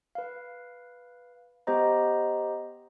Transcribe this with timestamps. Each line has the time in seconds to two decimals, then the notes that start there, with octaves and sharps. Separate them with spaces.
0.15 B4 F5
1.67 B3 G4 C5 D#5 A#5